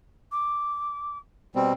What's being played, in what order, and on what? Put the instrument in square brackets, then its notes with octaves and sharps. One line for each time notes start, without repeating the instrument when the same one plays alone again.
[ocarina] D6
[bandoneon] B2 G3 C4